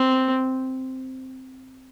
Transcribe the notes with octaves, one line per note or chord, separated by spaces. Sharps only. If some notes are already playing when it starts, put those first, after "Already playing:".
Already playing: C4